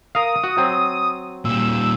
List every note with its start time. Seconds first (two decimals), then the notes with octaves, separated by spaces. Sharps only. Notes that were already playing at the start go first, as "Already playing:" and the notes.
0.15 A#4 F5 D#6
0.44 F#4
0.57 F#3 C4
1.45 A#2 G3 E6